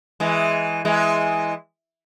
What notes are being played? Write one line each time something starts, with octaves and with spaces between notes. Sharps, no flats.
E3 G#3
E3 G#3